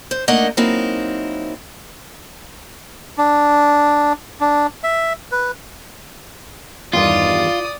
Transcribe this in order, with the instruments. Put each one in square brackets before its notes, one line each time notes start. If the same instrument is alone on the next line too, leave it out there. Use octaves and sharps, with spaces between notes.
[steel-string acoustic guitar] C5
A3 A#3 D4 D#4 D#5 F#5
F#3 A#3 C4 D#4 E4
[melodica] D4
D4
E5
B4
[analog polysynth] E2 G2 D#3 [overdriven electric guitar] F4 [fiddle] D5 D#6